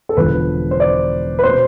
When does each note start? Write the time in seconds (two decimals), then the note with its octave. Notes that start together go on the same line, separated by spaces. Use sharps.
0.09 A4
0.17 E1 E2 D3 F3 B3 B4
0.71 C5
0.80 D5
1.39 B4
1.43 B2 C5